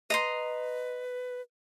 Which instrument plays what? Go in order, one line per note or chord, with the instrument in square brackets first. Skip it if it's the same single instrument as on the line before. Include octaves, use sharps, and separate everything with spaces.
[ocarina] B4 [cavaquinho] D#5 A#5 C6